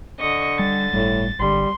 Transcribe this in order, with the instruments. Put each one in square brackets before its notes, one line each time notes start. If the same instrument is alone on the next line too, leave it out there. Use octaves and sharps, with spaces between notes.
[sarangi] D3 [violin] D#5 C#6
[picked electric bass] G3 [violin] A6
[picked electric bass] G1 G3 [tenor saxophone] A2
[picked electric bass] G#1 D3 [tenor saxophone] G3 [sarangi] C6